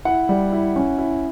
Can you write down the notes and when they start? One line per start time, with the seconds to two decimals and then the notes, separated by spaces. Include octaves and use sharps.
0.05 E4 F#5
0.29 G3
0.52 E4
0.76 C#4
0.98 E4